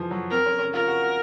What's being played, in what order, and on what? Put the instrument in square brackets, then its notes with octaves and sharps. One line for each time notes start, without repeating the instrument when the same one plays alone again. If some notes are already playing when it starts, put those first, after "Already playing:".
Already playing: [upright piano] E3 F3
F#3
[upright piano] C4 [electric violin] A#4
[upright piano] C#4
C#4
[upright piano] F4 [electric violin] A#4
[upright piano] F#4
F#4